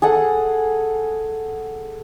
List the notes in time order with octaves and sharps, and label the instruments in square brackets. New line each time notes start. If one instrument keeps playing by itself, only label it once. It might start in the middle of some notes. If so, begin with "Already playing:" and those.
[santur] G#4 A4 F#5